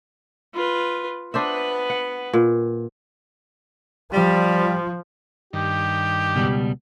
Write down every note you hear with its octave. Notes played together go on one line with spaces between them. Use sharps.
F4 B4
B3 D4 B4 C5 E5
F#5
A#2
F3 G3
G2 D#3 G4
C#2 B2 G3